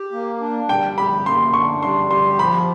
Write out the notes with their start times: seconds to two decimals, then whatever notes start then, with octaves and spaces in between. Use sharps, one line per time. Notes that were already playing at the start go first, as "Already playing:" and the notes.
Already playing: G4
0.12 A#3
0.41 D4
0.69 G3 G5
0.97 G4 B5
1.26 A#3 C6
1.54 D4 C#6
1.83 G3 C6
2.10 G4 C6
2.39 F3 B5